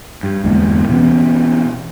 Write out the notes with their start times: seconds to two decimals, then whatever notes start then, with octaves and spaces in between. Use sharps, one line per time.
0.23 G2
0.44 G1 E2 G#3 A#3
0.89 B2 E3 B3 C#4